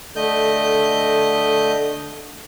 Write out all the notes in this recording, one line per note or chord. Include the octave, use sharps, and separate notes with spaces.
D3 A3 D#5 G6